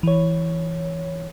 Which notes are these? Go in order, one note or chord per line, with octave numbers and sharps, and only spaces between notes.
E3 C#5